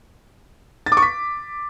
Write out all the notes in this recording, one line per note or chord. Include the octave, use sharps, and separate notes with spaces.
A6
D6
C#6
B6